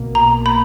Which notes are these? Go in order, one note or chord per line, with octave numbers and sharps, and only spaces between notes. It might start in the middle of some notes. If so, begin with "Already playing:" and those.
Already playing: B1 B2 A#3
A#5
B5